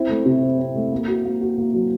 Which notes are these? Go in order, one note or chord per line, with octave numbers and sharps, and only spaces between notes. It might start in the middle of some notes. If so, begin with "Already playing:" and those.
Already playing: C4 E4
A3
C3
C4
C4
A3
A#3
F#4
A#3
F#4
A#3
F#3